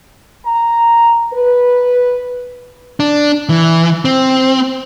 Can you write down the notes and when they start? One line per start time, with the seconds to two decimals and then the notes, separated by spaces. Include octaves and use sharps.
0.45 A#5
1.34 B4
3.00 D4
3.49 E3
4.05 C4